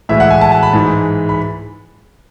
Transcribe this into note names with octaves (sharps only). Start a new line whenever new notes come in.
A2 E3 G#3 E5
F#5
G#5
A5
A5
B5
G#2 E3 G#3
B5